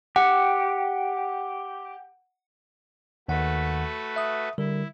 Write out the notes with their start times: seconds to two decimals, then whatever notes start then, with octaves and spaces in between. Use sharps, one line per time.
0.16 G4 F#5
3.28 D#2 D#3 A3 F#4 B4 F#5
4.16 E5 D#6
4.58 D3 G3 E4 A#4